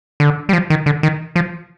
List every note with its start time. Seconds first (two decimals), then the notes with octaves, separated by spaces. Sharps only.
0.20 D3
0.49 G3
0.53 F3
0.70 D#3
0.86 D3
1.03 D#3
1.36 F3